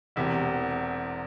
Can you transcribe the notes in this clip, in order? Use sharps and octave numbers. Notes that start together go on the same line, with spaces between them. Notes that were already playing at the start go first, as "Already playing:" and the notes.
E1 E2 C3